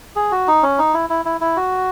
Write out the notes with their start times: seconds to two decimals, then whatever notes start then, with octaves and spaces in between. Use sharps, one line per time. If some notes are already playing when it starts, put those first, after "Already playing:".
0.16 G#4
0.32 F#4
0.48 D#4
0.63 C#4
0.78 D#4
0.94 E4
1.10 E4
1.25 E4
1.41 E4
1.56 F#4